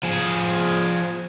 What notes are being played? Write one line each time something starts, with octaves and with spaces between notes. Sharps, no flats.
F3 G#4